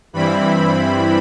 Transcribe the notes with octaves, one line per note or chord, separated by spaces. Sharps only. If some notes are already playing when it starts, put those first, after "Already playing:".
G2 E3 G3 C4 E4 B5